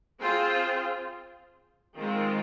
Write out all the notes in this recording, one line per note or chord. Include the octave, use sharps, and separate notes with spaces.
C4 F4 G#4 C5
D#3 G#3 C4 F4